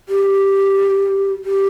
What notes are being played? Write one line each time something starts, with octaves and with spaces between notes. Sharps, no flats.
G4
G4